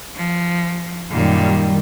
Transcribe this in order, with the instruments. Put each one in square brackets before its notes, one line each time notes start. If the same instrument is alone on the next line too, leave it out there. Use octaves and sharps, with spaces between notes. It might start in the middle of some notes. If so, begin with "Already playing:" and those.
[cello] F3
[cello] F#2 A#2 [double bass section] D#3 G3